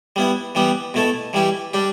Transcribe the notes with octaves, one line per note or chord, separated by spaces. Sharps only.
G3 B3 E4
E3 G3 B3 G4
B2 A3 E4 A4
E3 G3 E4 G4
G3 D4 G4